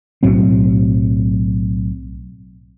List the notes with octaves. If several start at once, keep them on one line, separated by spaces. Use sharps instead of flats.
B1 A2 F#3 C4